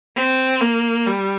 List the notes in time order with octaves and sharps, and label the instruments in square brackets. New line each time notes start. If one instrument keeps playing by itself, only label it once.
[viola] C4
A#3
G3